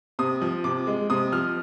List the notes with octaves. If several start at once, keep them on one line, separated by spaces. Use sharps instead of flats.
C3 D#6
F3
C3 D6
G#3
C3 D#6
F3 F6